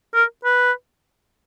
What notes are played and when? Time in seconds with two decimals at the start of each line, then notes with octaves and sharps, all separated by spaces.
0.14 A#4
0.45 B4